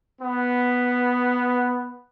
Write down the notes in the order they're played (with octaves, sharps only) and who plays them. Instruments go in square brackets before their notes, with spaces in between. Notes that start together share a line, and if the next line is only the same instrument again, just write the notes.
[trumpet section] B3